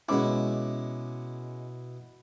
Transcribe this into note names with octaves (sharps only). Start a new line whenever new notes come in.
B2 G#3 C#4 E4 D6